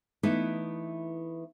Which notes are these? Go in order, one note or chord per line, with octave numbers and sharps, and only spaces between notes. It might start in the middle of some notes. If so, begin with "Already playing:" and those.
E3 A3 B3 D#4 E4 B4